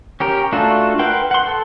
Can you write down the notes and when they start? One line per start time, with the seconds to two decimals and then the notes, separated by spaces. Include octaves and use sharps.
0.20 C#4 G4 A#4
0.52 A3 D4 F4 F#4 A4
0.99 A#4 B4 F#5 G5 C6
1.31 F#5 C6
1.46 A4